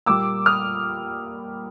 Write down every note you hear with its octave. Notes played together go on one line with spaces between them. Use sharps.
A#2 G3 A#3 D6 E6
D#6 F6